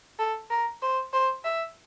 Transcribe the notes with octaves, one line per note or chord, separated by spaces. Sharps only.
A4
A#4
C5
C5
E5